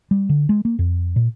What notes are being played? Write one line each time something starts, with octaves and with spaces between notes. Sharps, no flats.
G3
D3
G#3
A#3
F2
A#2